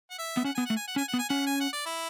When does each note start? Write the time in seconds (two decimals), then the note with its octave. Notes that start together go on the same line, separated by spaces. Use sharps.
0.11 F#5
0.19 E5
0.37 B3
0.44 C#4 F#5
0.55 B3 G#5
0.66 A3 F#5
0.76 G#5
0.88 F#5
0.96 C#4 G#5
1.08 F#5
1.14 B3
1.19 G#5
1.29 C#4 F#5
1.47 G#5
1.61 F#5
1.73 D5
1.86 E4